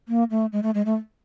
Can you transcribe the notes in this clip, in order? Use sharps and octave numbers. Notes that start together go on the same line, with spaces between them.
A#3
A3
G#3
A3
G#3
A3